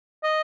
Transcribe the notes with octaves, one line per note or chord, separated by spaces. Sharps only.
D#5